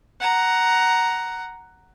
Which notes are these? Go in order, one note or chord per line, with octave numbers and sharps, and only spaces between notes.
F#5 A#5